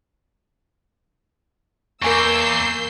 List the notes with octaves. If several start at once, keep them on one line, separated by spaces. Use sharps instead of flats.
E2 A#3 A#4 G#5 C#6 E6 G6 C7